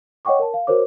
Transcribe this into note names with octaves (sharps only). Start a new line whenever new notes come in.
C#5 D#5 F#5 G5 C#6 D6
A#4 A5
F5
F#4 A#4 C5 C#5 D6